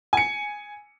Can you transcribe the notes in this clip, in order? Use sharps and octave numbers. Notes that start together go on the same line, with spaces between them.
G#5 C#7